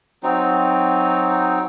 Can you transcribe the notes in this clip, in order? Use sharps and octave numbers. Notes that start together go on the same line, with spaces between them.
F#3 C4 D#4